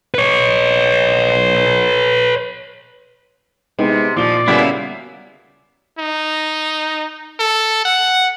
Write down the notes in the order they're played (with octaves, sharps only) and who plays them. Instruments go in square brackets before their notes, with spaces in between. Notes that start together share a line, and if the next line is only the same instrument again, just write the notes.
[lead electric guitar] B4 C#5
[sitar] C3 [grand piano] G#3 B3 D#4
[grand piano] A#2 G7 [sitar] F3 [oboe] D5
[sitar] C#3 A#3 E5 [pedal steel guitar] G3 B3 E4 [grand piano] F#4
[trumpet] D#4
A4
F#5